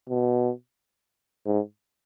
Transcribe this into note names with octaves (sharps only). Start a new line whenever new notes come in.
B2
G#2